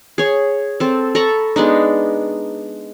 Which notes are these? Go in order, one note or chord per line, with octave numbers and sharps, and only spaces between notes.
G#4 C#5
C4 A4
A4 A#5 B5 C#6
G#3 B3 D4 D#4